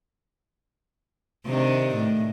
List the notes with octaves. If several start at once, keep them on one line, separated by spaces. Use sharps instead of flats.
C3 D#3 D4
A2